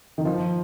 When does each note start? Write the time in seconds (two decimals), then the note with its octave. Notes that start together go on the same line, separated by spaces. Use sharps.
0.18 D#3
0.25 F3